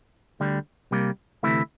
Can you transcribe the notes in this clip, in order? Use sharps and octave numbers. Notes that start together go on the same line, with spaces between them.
D2 D3 G3
C2 C3 G3 A#3
D2 C3 E3 A3 E4